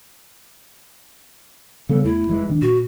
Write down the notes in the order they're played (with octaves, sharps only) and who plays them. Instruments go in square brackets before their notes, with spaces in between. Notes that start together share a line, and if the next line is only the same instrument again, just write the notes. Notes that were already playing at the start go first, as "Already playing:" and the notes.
[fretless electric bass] C#3 G3 B3 [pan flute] A4
[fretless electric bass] E2 A3 [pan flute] E4
[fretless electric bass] F1 E3 G#3
D#1 D#3 D4
[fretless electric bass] A#2 [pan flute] F#4